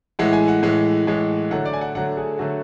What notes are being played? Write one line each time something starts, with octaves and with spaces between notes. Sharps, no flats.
A2 E3 G#3 F#5
G#5
F#5
A2 E3 G#3
A2 E3 G#3
D3 F#3 A3 F#5
D5
G#5
F#5
D3 F#3 A3 F#5
G#4
D3 F#3 A3 F#4